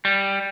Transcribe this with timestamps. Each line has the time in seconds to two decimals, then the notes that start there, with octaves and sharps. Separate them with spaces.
0.05 G3